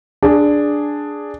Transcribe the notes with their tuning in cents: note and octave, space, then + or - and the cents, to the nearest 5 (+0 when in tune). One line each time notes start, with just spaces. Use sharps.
D4 +0 G#4 +0